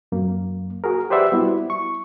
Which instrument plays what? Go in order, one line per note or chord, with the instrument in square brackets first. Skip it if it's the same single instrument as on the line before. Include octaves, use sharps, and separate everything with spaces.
[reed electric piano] F#2 A#3
F#4 G#4 A#4
G4 B4 C5 D5 E5 F#5
G3 B3 E4 F#4
C#6